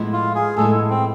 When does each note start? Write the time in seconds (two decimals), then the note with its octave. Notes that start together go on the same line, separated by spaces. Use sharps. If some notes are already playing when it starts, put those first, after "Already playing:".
Already playing: A2 F3 G#3 B3 E4
0.13 F4
0.35 G#4
0.57 A2 F3 G#3 B3 E4 A4
0.90 C4